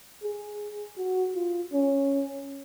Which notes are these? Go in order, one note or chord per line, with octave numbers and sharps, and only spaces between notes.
G#4
F#4
F4
C#4